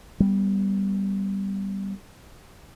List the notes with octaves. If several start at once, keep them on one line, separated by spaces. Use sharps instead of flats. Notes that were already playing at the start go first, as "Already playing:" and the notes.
G3 B3